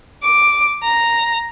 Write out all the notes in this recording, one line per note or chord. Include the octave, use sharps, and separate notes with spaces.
D6
A#5